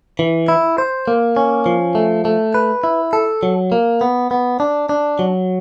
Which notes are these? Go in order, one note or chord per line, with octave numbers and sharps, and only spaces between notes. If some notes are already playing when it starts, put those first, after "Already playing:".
E3
E4
C5
A#3
C#4
F3
A3
A3
B4
E4
A4
F#3
A#3
B3
B3
D4
D4
F#3